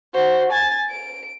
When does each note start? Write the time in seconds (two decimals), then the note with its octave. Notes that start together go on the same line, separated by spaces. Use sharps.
0.14 F#4 C5
0.52 G#5 A6
0.90 D7